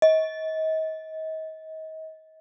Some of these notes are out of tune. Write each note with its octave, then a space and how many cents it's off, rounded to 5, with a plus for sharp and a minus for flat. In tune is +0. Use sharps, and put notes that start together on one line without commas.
D#5 +35